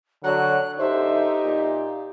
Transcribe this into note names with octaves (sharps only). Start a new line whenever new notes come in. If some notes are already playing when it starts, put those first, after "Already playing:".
D3 F#3 F#6
F#2 D3 D#4 G4 C5 E5
A#2